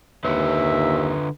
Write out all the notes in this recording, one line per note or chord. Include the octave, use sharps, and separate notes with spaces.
D#2 D3 B4 C#5 E5